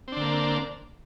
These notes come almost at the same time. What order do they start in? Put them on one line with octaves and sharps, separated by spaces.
C4 D4 D3 A#3